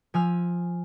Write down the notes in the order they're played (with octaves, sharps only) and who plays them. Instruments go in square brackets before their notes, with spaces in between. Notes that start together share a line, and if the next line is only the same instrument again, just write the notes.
[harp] F3 G#5 E6 F6